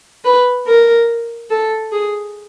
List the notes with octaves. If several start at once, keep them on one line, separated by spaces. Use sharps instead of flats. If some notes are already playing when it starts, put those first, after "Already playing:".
B4
A#4
A4
G#4